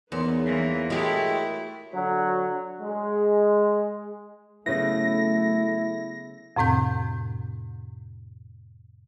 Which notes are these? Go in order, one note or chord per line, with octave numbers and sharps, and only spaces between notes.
E2 B3 D#4 G#4 A#4 C#5 C6
E3 A#3
G#3 A3 E4 F#4 G4
D3 F#3
G#3
C#3 F#3 A3 B3 E4 A#6
F2 A2 C3 C4 G6